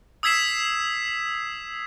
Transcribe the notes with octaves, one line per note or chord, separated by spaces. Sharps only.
D#6 E6 G#6 B6 C7 E7